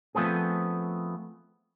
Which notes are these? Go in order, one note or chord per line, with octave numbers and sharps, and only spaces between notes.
F3 A3 B3 C4 G#4